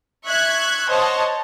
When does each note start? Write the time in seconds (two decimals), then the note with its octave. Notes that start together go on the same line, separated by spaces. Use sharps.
0.24 E5 C#6 F#6 G#6
0.88 C5 C#5 D#5 F#5 A5